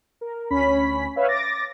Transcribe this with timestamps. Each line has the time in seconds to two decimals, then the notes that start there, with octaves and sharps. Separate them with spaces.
0.21 A#4
0.50 D2 C#4 B5 B6
1.16 B4 C#5 E5 F5
1.28 D6 A6 A#6